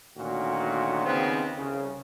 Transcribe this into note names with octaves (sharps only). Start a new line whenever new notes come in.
D2 A#2 D#3 C#4 F#4
D#2 C#3 B3 C4
C2 C#3